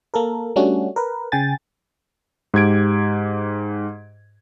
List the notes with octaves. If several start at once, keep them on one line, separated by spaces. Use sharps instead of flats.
A#3 A4 A#4
G3 A3 C#4 D4 F#4
A#4 B4
C#3 G5 G#5 A6
G#2 G4 G#6 D7